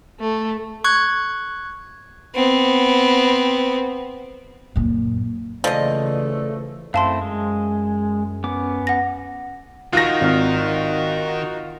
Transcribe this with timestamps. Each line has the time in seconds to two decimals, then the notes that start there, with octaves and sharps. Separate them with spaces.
0.20 A3
0.84 C#6 F#6 G#6
2.35 B3 C4
4.76 F#2 A#2
5.64 C#3 E3 F3 A3 D5 D#5
6.94 F#2 A3 C4 E4 F5 A5 C6
7.22 G#3
8.44 B3 C#4 D6
8.87 F#5 A#6
9.93 D#3 D#4 F4 F#4 A#6
10.21 G#1 F6